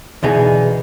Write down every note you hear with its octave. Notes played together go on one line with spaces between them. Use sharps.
D2 B2 E3 B3 D#4 G#4